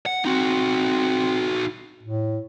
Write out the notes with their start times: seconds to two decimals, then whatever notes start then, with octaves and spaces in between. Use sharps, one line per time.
0.06 F#5
0.25 C4 D#4 F#4
2.03 A2